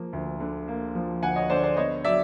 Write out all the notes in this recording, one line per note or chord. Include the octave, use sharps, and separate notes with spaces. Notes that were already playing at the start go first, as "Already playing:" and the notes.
Already playing: F3 A#3
D2
D3
A#3
F3
D2 F#5 G#5
C#5 D#5
D3 C5 D5
C5 D5
B3 C#5 D#5
F#3 D5 E5